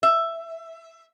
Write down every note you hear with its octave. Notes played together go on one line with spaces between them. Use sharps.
E5